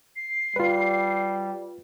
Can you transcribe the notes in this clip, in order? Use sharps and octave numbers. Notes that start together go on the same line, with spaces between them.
C7
G3 F4 B4